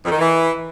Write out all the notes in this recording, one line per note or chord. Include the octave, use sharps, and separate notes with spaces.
F2
D#3
E3